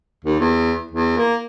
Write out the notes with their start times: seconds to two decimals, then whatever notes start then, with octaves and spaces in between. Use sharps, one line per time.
0.24 D#2
0.39 E2
0.91 E2
1.17 A#3